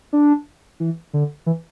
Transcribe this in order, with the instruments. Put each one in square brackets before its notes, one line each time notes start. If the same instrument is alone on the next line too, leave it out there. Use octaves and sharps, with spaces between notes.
[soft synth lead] D4
E3
D3
E3